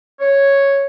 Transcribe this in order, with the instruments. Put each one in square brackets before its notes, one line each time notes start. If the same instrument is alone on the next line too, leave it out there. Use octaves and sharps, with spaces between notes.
[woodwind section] C#5